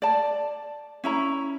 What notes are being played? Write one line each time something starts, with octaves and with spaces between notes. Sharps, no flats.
D5 A5
C#4 E4 A#5